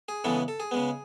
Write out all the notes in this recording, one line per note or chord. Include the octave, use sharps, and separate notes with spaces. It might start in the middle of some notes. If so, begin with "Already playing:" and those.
G#4
C#3 E3 G#3 B3 A4
A4
G#4
C#3 G#3 B3